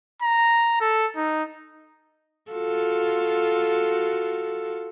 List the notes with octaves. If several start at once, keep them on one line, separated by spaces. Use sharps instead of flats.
A#5
A4
D#4
F4 F#4 A4